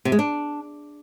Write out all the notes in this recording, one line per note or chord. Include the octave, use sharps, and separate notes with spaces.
C3
G#3
D4